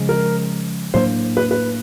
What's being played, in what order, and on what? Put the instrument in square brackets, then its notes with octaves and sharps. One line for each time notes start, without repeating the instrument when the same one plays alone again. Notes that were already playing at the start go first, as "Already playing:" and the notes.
Already playing: [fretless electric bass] C#3 F3 G#3
[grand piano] A#4
[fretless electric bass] A2 F#3 A#3 D4 [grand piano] C5
[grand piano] B4
B4